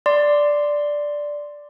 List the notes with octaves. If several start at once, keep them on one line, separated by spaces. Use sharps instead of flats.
D5 C6